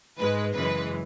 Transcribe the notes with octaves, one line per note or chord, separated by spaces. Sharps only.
G#2 G#3 B4
F#2 C#3 E3 G#3 B4